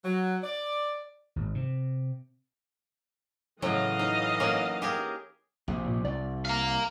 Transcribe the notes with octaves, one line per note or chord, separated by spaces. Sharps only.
F#3
D5
G#1
C3
A2 C#3 E3 F#3 D#5 F5
D#4
F#3 A#3 C#4
G4 G#4 A#4
A#1 C3
A#2
C2 D5
F5 A#5